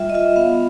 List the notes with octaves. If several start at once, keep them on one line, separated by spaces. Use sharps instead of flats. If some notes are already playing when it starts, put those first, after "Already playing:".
Already playing: G3 F4 E5
D#5
F4 E5
B3 F5